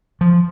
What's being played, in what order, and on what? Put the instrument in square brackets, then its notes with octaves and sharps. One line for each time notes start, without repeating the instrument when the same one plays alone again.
[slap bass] F3